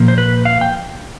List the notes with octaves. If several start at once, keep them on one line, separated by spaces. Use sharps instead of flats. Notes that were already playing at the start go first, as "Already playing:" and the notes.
Already playing: A#2 F3 A#3
C5
B4
F5
G5